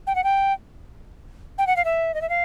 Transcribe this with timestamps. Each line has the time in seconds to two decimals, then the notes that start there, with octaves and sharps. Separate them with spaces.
0.07 G5
0.15 F#5
0.24 G5
1.58 G5
1.67 F#5
1.76 F5
1.85 E5
2.14 D#5
2.22 E5
2.29 F5